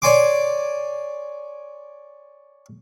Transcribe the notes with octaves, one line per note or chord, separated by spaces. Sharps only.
C#5 D5 G#5 C6 D6